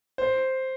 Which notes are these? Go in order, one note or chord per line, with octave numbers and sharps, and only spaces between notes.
C5